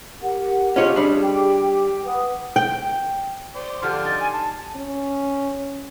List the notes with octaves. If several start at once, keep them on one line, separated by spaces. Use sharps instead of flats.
G4 A#4 F#5
C#4 F4 G4 G#4 C#5 D#5
G3 D4
G4 G5 D6
B4 F#5 D#6
G5
C5 D5
D3 F3 G4 D5 C6 F6
D#4 A6
G#5
A5
C#4